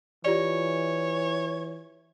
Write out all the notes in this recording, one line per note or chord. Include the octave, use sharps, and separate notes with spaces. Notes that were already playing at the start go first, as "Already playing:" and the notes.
E3 F4 G4 C#5 D5